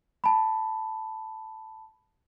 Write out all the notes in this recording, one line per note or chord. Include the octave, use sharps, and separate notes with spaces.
A5 B5